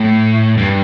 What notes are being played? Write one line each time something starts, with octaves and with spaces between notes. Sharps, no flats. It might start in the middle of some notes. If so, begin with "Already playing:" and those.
Already playing: A2
G2